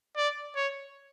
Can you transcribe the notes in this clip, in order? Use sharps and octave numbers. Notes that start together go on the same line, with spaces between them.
D5
C#5